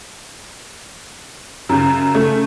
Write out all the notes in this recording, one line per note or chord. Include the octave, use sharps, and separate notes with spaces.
F#2 C#3
C#3 A3